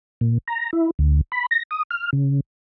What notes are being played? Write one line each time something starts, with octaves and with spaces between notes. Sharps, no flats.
A#2
A#5
E4
D2
B5
A#6
D#6
F6
C#3